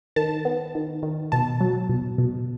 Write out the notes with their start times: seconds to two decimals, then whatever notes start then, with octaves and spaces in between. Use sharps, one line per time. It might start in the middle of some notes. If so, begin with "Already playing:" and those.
0.16 D#3 A5
0.45 B3
0.75 D#3
1.03 D#3
1.32 B2 A5
1.60 F#3
1.89 B2
2.18 B2